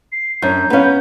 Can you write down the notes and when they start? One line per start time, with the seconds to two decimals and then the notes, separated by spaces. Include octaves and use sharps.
0.12 C7
0.42 F#2 D4 C#5 A#5 G6
0.70 B3 C#4 B4 F5